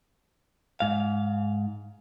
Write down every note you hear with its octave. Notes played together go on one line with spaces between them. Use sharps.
G#2 F5